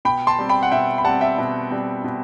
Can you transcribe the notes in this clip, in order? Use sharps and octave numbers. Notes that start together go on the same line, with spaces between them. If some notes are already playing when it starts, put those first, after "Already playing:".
B2 G5 B5
A5 C6
G3 C4
G5 B5
F#5
B2 E5 G5
B5
G3 C4 F#5 A5
E5 G5
B2
G3 C4
B2